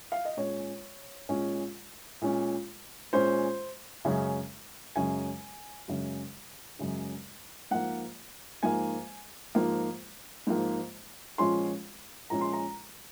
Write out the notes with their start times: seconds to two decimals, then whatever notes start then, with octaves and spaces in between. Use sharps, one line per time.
0.12 F5
0.25 D#5
0.37 A#2 G#3 C#4 C#5
1.29 A#2 G#3 C#4
2.22 A#2 G#3 C#4
3.13 A#2 G#3 C#4 C5
4.05 F#2 C#3 G#3 C#4
4.96 F#2 C#3 G#3 C#4 G#5
5.88 F#2 C#3 G#3 C#4
6.79 F#2 C#3 G#3 C#4
7.71 G#2 F3 A#3 F#5
8.63 G#2 F3 A#3 G#5
9.55 G#2 F3 A#3
10.47 G#2 F3 A#3
11.38 A#2 F3 G#3 C#4 C6
12.30 A#2 F3 G#3 C#4 A#5
12.41 C6
12.53 A#5